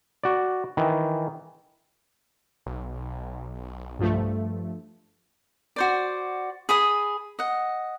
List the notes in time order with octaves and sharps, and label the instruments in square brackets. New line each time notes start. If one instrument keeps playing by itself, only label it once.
[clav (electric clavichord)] F#4 D5
D#3 E3
[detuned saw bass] B1
[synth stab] G2 F3 A3
[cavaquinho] F#4 C5 D5
G#4 B5 D#6
D#5 F#5